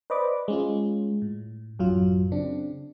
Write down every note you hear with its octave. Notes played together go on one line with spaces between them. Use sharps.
B4 C5 D5 D#5 B5 D6
G#3 C#4 F4
A2
A1 F#2 F#3 F4
C#3 C4 D4